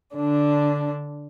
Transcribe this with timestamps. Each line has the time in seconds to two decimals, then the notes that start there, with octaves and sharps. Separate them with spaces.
0.16 D3 D4